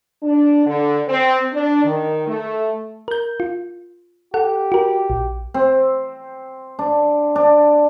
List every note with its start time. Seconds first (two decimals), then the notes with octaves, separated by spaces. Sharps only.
0.22 D4
0.66 D3
1.07 C4
1.52 D4
1.84 D#3
2.27 A3
3.08 A#4 G6
3.40 F4
4.34 G4 A4 F#5
4.72 F#4 A#4
5.10 A#1
5.54 C4
6.79 D4
7.36 D4